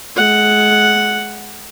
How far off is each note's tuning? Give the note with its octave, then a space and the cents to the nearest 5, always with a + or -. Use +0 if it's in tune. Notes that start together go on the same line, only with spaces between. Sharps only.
G#3 +30 F#5 +0